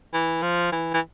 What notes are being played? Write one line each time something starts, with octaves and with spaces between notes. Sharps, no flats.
E3
F3
E3
E3